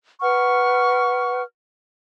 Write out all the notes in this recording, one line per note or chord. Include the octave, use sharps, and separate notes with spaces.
B4 F#5 C#6 F6